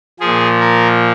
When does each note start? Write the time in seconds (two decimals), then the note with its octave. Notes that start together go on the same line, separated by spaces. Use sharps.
0.20 A#2 F3 G#4
0.60 A#4